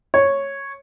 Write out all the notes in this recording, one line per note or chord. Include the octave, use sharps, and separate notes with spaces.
C#5